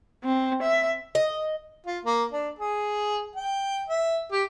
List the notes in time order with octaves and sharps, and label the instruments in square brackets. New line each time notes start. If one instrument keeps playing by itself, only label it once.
[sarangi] C4
E5
[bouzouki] D#5
[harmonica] F4
A#3
D4
G#4
G5
E5
G4